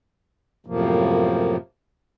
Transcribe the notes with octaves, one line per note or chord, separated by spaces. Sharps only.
F#2 A2 C3 F3 A#3